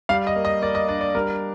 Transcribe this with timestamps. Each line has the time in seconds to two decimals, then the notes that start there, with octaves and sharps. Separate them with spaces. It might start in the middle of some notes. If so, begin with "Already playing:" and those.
0.09 G3 F5
0.27 D#5
0.36 A#3
0.45 D#5
0.62 A#3 D5
0.75 D#5
0.88 D4 D5
1.01 D5
1.15 G3 A#4